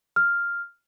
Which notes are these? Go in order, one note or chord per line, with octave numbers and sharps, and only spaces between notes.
F6